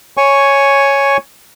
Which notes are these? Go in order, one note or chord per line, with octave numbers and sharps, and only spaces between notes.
C#5 G#5 C#6